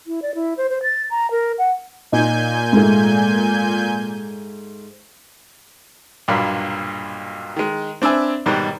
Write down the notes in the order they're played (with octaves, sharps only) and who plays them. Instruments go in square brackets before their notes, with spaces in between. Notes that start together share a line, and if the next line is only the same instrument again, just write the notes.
[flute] E4
D5
E4
C5
C5
A6
A#5
A#4
F#5
[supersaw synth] A#2 G#5 G6 [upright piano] D#4
[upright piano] G#2 A3
[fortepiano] B1 G2 A#2 F#3 A#3 B5
D#3 G#3
C4 D4 B4 E5 G#5
G#2 B2 D#3 F#3 G3